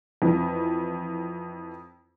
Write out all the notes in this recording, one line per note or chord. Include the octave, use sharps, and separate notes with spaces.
F2 E3